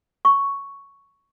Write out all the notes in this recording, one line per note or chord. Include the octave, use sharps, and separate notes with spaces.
C#6